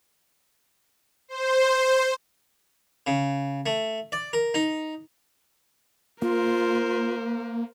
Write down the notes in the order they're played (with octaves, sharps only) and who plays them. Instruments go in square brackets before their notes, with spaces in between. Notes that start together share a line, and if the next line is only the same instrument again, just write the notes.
[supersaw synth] C5
[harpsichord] C#3
A3
D5
A#4
D#4
[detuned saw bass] A#3 [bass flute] F4 [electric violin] A#4 C5